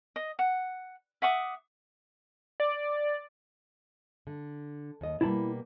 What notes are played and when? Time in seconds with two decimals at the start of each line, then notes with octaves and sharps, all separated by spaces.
0.16 D#5
0.39 F#5
1.22 E5 F#5 D6 D#6
2.60 D5
4.27 D3
5.01 D#2 D#5
5.21 B2 G3 A#3 E4 A5 B5